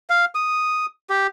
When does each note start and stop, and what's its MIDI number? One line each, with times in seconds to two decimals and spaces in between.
0.10 0.25 77
0.35 0.86 87
1.10 1.27 67